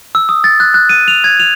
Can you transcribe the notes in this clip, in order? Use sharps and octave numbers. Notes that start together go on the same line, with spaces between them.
E6
D#6
A6
F#6
F#6
D#7
F7
G#6
F7